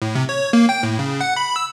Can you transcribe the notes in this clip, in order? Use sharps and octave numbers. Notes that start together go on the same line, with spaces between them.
A2
C3
C#5
A#3
G5
A2
C#3
F#5
B5
E6